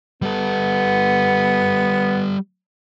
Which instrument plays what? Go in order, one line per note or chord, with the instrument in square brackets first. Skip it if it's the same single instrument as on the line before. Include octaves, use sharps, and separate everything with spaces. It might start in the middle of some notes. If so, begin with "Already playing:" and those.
[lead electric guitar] G3 A4 [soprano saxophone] B3